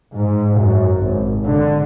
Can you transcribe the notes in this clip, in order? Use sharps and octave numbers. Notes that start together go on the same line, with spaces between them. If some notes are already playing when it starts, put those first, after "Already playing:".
G#2
F#2
G#1
D3